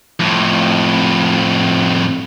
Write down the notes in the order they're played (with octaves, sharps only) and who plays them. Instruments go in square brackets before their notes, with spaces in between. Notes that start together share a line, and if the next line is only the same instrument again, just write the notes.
[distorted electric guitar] F2 A2